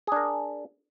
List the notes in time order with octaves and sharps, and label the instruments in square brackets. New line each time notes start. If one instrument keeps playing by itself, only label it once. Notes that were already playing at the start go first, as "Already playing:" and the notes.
[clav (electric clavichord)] G#4
D4
A#4